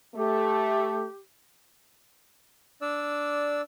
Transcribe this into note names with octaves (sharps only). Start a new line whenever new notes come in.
A3 G4
D4 D5 E6